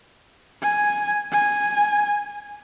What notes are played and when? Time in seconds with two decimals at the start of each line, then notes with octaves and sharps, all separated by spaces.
0.63 G#5
1.33 G#5